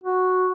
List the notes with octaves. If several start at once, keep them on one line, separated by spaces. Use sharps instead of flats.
F#4